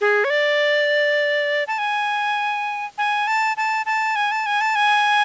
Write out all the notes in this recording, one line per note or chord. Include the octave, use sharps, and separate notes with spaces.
G#4
C#5
D5
A5
G#5
G#5
A5
A5
A5
G#5
A5
G#5
A5
G#5